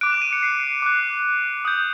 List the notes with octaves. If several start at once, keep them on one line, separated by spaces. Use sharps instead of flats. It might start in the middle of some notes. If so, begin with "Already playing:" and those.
D6 F#6 D7
E7
D#7
C#7
C7
D6 F#6
D#6 G6